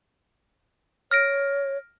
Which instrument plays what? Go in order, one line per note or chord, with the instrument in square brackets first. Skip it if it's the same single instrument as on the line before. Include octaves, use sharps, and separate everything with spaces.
[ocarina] C#5 [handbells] F6 A#6 D7